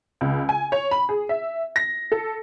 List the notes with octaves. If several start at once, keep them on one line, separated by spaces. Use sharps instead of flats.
C#2
G#5
C#5
B5
G#4
E5
A#6
A4